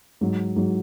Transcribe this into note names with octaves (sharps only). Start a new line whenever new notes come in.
G#2 F#3
G#2 F#3